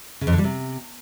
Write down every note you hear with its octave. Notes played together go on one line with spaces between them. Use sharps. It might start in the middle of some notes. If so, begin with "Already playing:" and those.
C#3
F2
D3
G3
C3